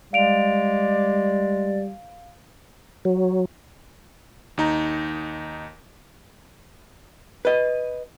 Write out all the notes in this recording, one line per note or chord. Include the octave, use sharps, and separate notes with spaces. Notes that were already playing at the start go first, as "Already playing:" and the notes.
G3 G#3 D5 F5 D7 F7
F#3
D#2 D#4 A#5
B4 D#5